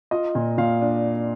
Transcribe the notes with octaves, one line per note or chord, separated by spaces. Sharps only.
F4 D#5
A#2
A#2 F5
D4